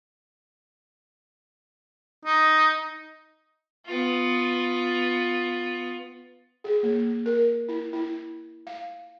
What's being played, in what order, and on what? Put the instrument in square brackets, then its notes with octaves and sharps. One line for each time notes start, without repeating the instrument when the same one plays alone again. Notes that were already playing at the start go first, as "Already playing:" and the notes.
[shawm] D#4
[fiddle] B3 F4
[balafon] G#4
A#3
A#4
E4
E4
F5